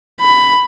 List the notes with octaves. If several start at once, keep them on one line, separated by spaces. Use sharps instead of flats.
B5